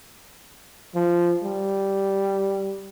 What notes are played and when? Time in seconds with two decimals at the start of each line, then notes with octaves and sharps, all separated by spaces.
0.95 F3
1.44 G3